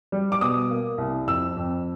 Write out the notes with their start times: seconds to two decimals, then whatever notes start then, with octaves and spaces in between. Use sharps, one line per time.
0.12 G3
0.32 D6
0.41 B2 D#6
0.70 A#3
0.98 C2
1.27 F2 E6
1.57 F2